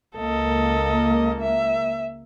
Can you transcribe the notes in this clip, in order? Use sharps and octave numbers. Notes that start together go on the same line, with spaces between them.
C#2 A#3 A4 D#5
E5